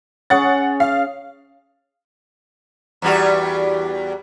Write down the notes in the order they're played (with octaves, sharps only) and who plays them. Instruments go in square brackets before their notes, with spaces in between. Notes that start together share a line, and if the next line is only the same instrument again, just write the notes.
[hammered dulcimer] C#4 G#4 C#5 [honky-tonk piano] F#5 A6
[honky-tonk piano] F5
[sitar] E2 G3 F#4